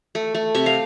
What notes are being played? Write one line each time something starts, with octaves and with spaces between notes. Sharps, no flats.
A3
A3
C3 E5
F5